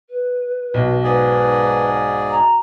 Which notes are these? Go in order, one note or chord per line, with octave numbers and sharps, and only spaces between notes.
B4
B1
G#2 G#4 B4 D5
A#5